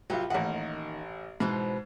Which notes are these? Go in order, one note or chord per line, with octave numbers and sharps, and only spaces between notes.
C2 F#3 F4
A1 D#3 A#3 F#5
G#2 B2 E3 C4